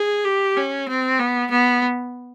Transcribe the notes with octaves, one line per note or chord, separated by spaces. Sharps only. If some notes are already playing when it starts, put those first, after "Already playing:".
Already playing: G#4
G4
C#4
C4
B3
B3